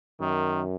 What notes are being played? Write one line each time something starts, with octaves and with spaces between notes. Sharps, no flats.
F#2 D#3